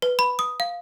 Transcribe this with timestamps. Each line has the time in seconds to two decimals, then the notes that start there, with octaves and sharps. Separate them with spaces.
0.02 B4
0.19 B5
0.39 D#6
0.60 F5